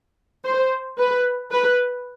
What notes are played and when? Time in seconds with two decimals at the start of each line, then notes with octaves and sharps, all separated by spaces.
0.44 C5
0.98 B4
1.51 B4